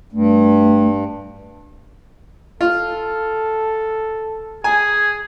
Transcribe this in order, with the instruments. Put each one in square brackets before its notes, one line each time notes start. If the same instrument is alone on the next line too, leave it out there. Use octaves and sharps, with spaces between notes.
[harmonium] G2 [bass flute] A3
[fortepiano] F4 [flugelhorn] A4
[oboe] G#4 [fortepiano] G#5